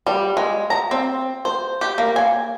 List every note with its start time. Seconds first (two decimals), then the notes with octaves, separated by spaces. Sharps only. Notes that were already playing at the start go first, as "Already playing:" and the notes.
0.07 G3
0.37 G#3
0.70 A#5
0.91 C4
1.45 C5
1.81 G4
1.98 A#3
2.16 G#5